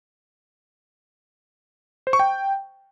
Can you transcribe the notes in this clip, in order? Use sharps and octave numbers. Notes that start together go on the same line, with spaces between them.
C5
C#6
G5